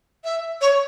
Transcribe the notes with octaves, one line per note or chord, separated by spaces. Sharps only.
E5
C#5